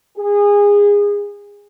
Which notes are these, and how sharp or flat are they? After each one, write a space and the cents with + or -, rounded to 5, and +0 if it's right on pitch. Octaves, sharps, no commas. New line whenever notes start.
G#4 -25